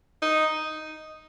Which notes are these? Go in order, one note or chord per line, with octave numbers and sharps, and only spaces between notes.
D#4